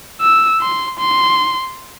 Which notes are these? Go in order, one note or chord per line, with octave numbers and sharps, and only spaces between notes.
E6
C6
C6